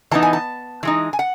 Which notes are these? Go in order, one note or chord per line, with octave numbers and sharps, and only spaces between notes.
E3 B3 D#4 A5
G#5
A5
E3 G#3 D#4
G#5
F#5